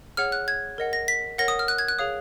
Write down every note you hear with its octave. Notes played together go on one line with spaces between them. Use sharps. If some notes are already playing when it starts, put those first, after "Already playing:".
G#4 C#5 F#5 F6
F#6
G#6
A#4 D#5 F#5
A#6
B6
A#4 C#5 F#5 A#6
D#6
F6
F#6
G#6
F#6
G#4 C#5 F5 D#6